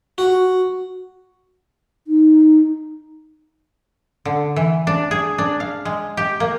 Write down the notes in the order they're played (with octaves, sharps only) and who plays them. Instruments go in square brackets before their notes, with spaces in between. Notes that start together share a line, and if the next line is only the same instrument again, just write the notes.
[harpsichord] F#4
[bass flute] D#4
[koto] D3
E3
D4
G#4
D4
F5
G#3
G4
A#3